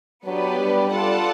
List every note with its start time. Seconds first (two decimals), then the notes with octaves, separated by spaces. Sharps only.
0.25 F#3 B3 D4 G4 B4 D5
0.59 G3
0.92 F4 A4 D5 F#5 A5